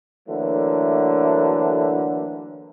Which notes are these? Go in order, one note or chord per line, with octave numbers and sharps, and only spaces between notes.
D3 E3 F#3 A3 A#3